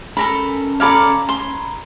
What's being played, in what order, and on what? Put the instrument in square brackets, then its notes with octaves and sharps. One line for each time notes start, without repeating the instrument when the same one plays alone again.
[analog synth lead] C#4 [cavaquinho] A4 A#4 B5
[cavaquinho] A4 D5 F5 [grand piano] A#5 B5 G#6
[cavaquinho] C6